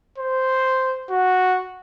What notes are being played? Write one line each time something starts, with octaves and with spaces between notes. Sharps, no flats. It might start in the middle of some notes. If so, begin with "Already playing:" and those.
C5
F#4